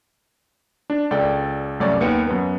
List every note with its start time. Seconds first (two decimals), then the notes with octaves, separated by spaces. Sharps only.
0.90 D4
1.11 C#2 A4 D5 G5
1.80 C2 F#2 A3 C#5 D5
2.01 D#2 B3 C#7
2.27 F#2 B3